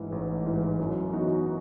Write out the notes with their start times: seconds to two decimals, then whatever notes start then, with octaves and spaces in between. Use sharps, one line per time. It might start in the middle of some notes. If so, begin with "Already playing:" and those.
Already playing: A1 G#2 E3
0.12 A1
0.46 G#2 E3
0.79 F#2
1.12 E3 B3 D#4 F#4